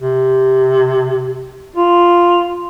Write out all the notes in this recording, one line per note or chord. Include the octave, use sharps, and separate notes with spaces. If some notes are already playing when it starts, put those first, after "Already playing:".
C3
F4